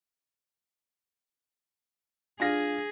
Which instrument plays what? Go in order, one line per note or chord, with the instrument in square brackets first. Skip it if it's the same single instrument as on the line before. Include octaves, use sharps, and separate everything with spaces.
[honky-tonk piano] D4 F4 A#6 [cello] G#4